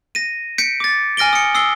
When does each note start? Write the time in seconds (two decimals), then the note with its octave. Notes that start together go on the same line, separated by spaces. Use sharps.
0.15 A#6 D#7
0.58 G6 B6 C#7 D7
0.80 D6 A6
1.17 G#5 F6 A#6 D7 G7
1.33 D#6 C#7
1.55 D#6 E6 C7 G7